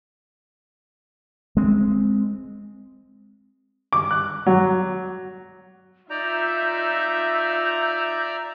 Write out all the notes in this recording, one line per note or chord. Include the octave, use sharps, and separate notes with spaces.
G#3 C4
D6
F#6
F#3
D#4 F4 D5 E5 A#5 G6